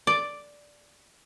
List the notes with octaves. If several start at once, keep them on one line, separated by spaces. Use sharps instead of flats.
D5